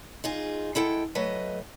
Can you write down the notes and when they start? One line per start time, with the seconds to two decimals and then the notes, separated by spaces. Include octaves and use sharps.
0.24 D#4 F4 G#4
0.75 G#3 E4 A4 F#5 G5
1.15 F#3 A3 B4 D#5